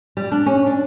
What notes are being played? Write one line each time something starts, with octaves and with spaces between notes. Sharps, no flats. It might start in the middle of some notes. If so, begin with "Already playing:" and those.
G3
D4
C#4
D4